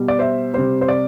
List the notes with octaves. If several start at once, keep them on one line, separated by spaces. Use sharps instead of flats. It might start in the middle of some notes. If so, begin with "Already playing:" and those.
Already playing: B2 G3
D5
C5 E5
C3 G3 C5
C5
D5